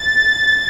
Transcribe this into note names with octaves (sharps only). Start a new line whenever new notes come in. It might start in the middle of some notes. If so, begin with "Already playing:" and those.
Already playing: A6